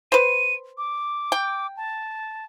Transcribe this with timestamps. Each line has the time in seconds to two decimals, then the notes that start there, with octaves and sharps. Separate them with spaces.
0.12 B4 C5 D#7
0.78 D6
1.32 G5
1.77 A5